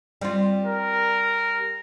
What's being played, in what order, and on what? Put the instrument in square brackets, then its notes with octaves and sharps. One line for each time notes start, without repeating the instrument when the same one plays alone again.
[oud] G3 C4 F4
[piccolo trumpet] A#4